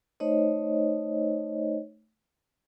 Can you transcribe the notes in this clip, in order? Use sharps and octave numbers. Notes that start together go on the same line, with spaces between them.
A3 D#4 C5 C#5 D#5